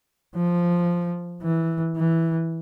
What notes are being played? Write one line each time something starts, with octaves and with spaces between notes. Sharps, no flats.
F3
E3
E3